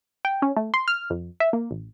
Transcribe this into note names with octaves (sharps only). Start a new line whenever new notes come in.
G5
C#4
A3
C6
F6
F2
E5
A#3
A1